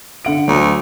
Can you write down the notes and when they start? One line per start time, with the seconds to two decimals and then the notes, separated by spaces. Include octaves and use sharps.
0.25 D3 F#5 D7
0.48 D2 F#3